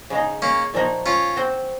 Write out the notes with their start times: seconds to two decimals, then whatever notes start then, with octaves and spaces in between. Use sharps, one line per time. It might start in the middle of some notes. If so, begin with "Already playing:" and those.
0.10 C#3 G#3 D#4
0.42 A#3 C#4
0.74 A#2 F3 A#3 D#4 F#4
1.06 C#4 F4
1.37 C4 F#4 C5